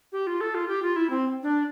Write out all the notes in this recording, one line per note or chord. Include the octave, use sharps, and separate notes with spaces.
G4
F4
A4
F4
G4
F4
E4
C4
D4